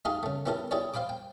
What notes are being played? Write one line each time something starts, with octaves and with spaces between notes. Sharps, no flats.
A3 D#4 G4 G#4 F5
C#3 A3
B3 C#4 E4 G4 A4 A#4
E4 G4 G#4 C#5 D5
C5 F5 G5 B5 D6
G5